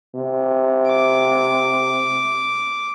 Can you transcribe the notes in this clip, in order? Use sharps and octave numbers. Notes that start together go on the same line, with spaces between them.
C3
D6